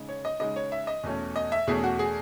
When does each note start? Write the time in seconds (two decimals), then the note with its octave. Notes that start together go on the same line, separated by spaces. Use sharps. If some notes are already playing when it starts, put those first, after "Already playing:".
Already playing: C#3 G#3 D#4
0.09 C#5
0.25 D#5
0.40 C#3 G#3 D#4 D#5
0.56 C#5
0.72 E5
0.87 D#5
1.03 E2 B2 A3 C#4
1.36 D#5
1.52 E5
1.67 E2 B2 A3 C#4 G#4
1.84 F#4
1.99 G#4